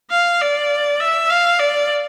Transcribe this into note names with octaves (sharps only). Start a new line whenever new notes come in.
F5
D5
E5
F5
D5